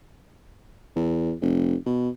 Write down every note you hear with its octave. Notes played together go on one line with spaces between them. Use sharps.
E2
F1
B2